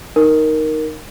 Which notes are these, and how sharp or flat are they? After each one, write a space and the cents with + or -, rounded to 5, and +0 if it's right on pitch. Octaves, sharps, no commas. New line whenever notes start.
D#4 +0 A#4 +0